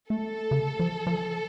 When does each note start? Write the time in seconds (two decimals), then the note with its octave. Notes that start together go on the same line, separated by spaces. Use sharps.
0.10 A3 A4
0.51 C#3
0.80 F3
1.07 F3